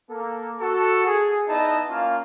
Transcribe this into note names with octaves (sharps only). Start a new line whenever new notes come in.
A#3 A4
F#4 A4
G#4
B3 D#4 E4 D5 D#5 A5
A#3 C#4 F4 F5